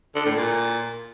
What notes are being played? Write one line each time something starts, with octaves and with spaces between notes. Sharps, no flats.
D3
A2
A#2